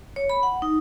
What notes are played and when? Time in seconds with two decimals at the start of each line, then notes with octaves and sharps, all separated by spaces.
0.16 C#5
0.30 B5
0.43 F#5
0.62 D#4